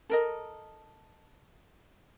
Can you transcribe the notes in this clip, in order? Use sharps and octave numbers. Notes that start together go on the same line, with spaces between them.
A4 A#4 D#5